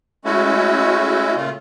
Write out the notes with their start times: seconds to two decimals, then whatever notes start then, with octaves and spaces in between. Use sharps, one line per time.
0.25 G#3 A3 C#4 E4 F#4
1.36 A#2 C#3 A3 F4